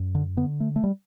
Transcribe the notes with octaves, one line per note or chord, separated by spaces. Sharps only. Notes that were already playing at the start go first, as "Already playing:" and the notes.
Already playing: F#2
D3
D3 B3
A3
A3
G3